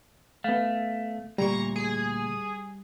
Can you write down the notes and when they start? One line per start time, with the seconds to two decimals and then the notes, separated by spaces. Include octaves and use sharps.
0.44 A3 B3 F5
1.38 D2 A#2 G3 A#5 C#6
1.76 G#4